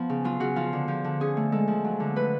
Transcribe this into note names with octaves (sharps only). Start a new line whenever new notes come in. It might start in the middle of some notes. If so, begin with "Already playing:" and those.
Already playing: F3 B3
C#3
F#3 F4
C#3 F#4
F3 F4
D3
F3
D3
C#4 G#4
A3
G#3 A4
F3
F#3
D3
A3 B4